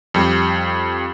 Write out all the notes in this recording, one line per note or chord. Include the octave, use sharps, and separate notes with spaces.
F2 G3